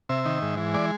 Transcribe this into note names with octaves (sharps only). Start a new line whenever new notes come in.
C3 E5
D#3
G#2
E3
G#3 D5